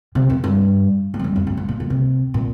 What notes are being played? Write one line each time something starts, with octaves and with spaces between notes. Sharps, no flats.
C3
F2
G2
G#2
F2
G2
F2
G2
G#2
A#2
A#2
C3
A#2